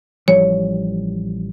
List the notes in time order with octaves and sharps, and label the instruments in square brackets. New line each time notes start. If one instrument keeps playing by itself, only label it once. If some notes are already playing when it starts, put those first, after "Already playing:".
[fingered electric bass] A1 F3 G3 [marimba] C#5